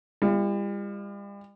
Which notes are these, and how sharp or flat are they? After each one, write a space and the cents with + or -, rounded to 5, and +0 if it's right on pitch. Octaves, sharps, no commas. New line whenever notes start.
G3 +40 F4 -45